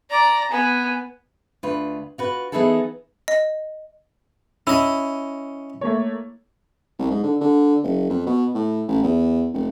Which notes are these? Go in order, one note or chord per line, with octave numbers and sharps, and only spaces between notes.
D5 A#5
B3 G#5
D2 F4 B4
F4 F#4 B4
E3 B3 D#4 E4 G#4 A4
D#5
C#4 E4 D#5
A3 A#3 C#5
C2
G#2
D3
D3
F#1
F2
B2
A2
A1
E2
F1